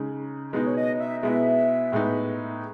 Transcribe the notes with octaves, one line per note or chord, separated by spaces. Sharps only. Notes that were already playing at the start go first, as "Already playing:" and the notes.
Already playing: C#3 G#3 D#4
B2 G#3 B3 D#4 D#5
C#5
D#5
E5
B2 G#3 B3 E4 E5
A2 G#3 B3 D#4